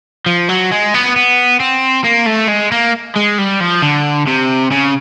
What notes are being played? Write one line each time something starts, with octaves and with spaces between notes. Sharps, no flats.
F3
F#3
G#3
B3
B3
C4
A#3
A3
G#3
A#3
G#3
G3
F3
D3
C3
C#3